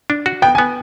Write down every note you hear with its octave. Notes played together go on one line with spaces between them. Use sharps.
D4
F#4
B3 G5
G#5
B3